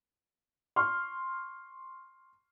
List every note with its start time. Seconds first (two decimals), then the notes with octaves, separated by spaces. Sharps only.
0.76 C6 C#6 F6